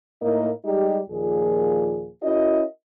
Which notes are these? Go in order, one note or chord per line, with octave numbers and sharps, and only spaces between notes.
A2 A#3 D#4 E4 A#4 D#5
G3 G#3 D#4 G4
D#2 A#2 F3 G#4
C#4 E4 F#4 A#4 D#5